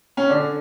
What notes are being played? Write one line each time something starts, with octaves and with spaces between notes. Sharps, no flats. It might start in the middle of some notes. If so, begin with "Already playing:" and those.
C#4
D3 D4